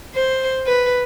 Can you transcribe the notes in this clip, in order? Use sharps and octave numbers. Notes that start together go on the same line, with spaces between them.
C5
B4